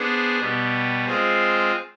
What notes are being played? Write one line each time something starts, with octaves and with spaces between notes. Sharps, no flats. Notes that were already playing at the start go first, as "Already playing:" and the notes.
Already playing: B3 D4 G#4 C5
B2 G3 B3
G#3 C4 F4 G#4 C5